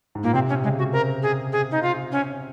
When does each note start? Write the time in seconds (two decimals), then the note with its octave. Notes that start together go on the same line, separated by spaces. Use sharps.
0.15 G#2
0.23 A#2 A#3
0.33 C3 C4
0.49 C#4
0.63 C#3 G#3
0.78 F#4
0.92 C4 A#4
1.23 G#4
1.52 G#4
1.71 D#4
1.83 F4
2.12 C#4